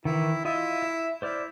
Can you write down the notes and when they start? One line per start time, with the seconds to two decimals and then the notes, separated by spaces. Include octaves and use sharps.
0.05 D#3 E3 E4
0.45 E4 F4 D#5 E5
0.83 E5
1.22 E4 C5 D5 F6